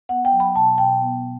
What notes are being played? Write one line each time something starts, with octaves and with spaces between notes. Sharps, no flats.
B3 F#5
G5
F#3
B5
B2 A5
B2 G5
B3